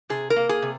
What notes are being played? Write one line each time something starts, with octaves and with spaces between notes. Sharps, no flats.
C3 G#4
A#4
A#3
G#4
C3